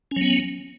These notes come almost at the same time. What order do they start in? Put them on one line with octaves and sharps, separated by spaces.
C#4 F#3 B3